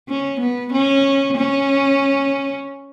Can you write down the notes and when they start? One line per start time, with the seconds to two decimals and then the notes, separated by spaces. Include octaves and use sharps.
0.09 C#4
0.40 B3
0.72 C#4
1.37 C#4